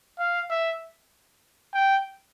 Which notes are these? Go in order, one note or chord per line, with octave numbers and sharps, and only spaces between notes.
F5
E5
G5